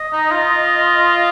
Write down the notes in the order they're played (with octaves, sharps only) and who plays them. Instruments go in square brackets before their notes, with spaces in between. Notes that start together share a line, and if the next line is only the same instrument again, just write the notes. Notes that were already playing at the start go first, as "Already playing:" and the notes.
Already playing: [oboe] D#5
[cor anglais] D#4
F4